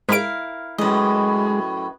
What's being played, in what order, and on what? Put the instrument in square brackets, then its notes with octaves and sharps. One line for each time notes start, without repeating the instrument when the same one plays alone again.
[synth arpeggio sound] G#2 D7 [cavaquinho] E4 A#4 F5
[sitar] F#2 A2 [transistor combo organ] G#3 [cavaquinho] B4 D#5